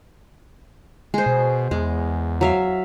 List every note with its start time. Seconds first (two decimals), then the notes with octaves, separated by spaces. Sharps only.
1.14 G#3 G#4 C5
1.26 B2
1.71 E2 G#3
2.41 F#3 E5 F5